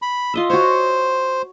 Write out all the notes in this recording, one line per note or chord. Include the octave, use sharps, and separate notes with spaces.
B5
F4 D#5 E5
F#4 C5 C#5